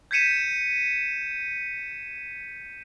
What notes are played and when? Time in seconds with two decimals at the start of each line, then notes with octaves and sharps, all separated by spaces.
0.11 G6 G#6 B6 C#7 D#7 E7